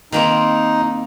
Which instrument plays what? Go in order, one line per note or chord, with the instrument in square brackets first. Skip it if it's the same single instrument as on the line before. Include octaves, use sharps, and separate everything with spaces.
[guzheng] D#3 A#3 C4 [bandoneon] D#4